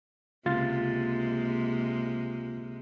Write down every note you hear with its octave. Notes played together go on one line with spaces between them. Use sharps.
C#2 C3 G#3 A#3 F4 A6